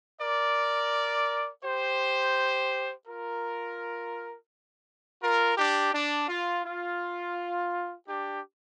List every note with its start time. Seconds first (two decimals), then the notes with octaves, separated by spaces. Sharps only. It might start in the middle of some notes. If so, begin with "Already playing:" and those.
0.20 A#4 D5
1.63 G4 C5
3.06 F4 A#4
5.21 F4 A#4
5.57 D4 G4
5.93 D4
6.28 F4
6.65 F4
8.07 D4 G4